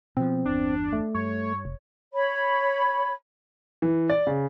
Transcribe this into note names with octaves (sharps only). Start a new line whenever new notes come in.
B2 D3 F3 C4
G1 E2 D4
A3
G2 C#5
F1
C#5 B5
E3
D5
C#3